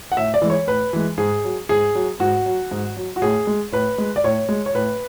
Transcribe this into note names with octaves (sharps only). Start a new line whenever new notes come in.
F#5
A2 E5
D5
E3 G#3
C#5
A2 B4
E3 G#3
G#2 G#4
F#3
G#2 G#4
F#3
G#2 F#4
F#3
G#2
F#3
F#4
A2 G#4
G#3
A2 B4
G#3
D5
A2 C#5
G#3
C#5
A2 B4